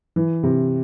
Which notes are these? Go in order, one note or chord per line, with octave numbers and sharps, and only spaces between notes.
E3
C3